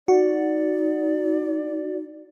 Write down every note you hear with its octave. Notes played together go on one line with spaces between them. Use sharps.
D#4 F#4 D5